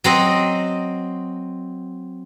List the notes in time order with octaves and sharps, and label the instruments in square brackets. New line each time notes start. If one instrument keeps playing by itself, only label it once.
[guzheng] F#3 C4 D#5